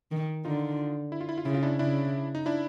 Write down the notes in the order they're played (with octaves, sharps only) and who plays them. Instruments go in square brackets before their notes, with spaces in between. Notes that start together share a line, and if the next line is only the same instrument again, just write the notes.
[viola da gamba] D#3
[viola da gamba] D3 [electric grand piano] D#4 F4
[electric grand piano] E4
F4
E4
F4
[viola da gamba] C#3 [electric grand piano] E4
[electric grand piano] F4
D4 E4
[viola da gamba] C#3 [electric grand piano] D4 E4
[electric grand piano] D#4
D4 E4